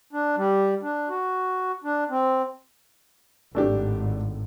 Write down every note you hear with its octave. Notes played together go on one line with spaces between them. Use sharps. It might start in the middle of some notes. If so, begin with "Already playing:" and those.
D4
G3
D4
F#4
D4
C4
G#1 A2 A3 D4 G4